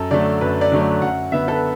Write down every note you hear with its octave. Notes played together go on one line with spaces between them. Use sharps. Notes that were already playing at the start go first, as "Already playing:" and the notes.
Already playing: F#2 A4
D3 F#3 A3 D5
F#2 B4
D5
D3 F#3 A3
D5
F#2 F#5
D3 B3 E5
A4
B4